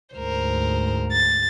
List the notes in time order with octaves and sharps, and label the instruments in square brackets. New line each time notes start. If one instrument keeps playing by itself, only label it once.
[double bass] D2 G#2 [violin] A#4 C5
[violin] A6